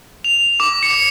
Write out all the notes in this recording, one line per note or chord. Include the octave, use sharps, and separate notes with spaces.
F7
D6
C#7